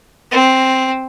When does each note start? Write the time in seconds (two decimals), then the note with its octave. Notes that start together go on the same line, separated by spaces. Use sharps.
0.31 C4